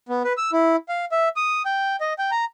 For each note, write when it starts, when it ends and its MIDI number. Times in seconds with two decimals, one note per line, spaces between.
0.09 0.23 59
0.24 0.33 71
0.37 0.51 88
0.52 0.76 64
0.89 1.05 77
1.12 1.29 76
1.36 1.62 87
1.65 1.96 79
2.00 2.13 75
2.19 2.31 79
2.31 2.45 82